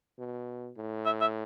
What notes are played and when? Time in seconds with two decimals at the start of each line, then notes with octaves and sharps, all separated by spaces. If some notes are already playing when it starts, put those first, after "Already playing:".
0.19 B2
0.77 A2
1.06 E5
1.21 E5